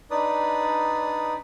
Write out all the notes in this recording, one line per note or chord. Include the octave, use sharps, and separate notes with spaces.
D4 D#4 B4 D5 D#6